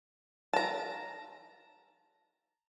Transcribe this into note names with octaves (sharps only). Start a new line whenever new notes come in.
A5 A#5